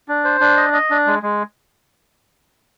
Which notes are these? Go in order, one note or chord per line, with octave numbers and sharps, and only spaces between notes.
D4
C5
D4
D#5
D#5
D4
G#3
G#3